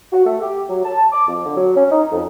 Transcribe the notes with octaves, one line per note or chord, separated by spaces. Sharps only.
F#4
A3
G4
F#3
A5
D6
F2
D3
F#3
C#4
D#4
F2